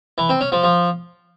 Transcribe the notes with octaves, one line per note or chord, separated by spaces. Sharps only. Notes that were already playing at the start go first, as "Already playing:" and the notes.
E3
C4
C#4
F3
F3